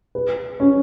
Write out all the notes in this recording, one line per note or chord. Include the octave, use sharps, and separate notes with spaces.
B4
C#4